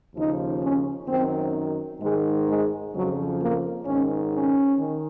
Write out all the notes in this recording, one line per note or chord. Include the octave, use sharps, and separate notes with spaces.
D#2 C#3 F3 D#4
C#4
F#2 D#3 C4
G#2 D#3 G#3
G#3
F2 C#3 F3 F#3
A#3
G#2 D#3 C#4
C#4
D#3